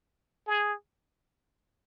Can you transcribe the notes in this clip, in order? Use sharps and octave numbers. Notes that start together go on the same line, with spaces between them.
G#4